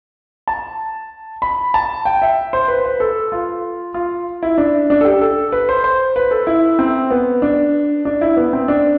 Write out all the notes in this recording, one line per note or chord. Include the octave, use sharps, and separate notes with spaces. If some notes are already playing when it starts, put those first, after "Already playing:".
A5
B5
A5
G5
E5
C5
B4
B4
A4
F4
F4
E4
D4
D4
A4
G4
A4
B4
C5
C5
B4
A4
E4
C4
B3
D4
D4
E4
B3
C4
D4